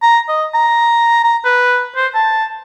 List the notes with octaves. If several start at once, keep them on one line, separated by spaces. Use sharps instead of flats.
A#5
D#5
A#5
A#5
B4
C5
A5